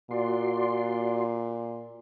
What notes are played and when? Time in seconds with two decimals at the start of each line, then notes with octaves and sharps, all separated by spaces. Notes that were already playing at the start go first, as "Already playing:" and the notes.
0.11 A#2 F#4 D5 C6